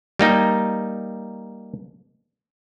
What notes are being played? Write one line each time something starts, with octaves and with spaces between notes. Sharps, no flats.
G3 A#3 D#4